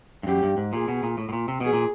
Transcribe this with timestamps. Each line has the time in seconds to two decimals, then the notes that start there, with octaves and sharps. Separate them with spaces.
0.23 G2
0.27 F#2 G4
0.43 G2
0.57 G#2
0.72 A#2 G#4
0.88 B2
1.03 A#2
1.18 A2
1.29 A2
1.33 A#2
1.48 C3
1.60 B2 G#4
1.73 A#2